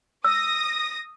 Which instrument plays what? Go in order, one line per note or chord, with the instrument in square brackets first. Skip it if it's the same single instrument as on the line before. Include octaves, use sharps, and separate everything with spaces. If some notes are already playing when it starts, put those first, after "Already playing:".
[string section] D#6 A#6 [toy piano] E6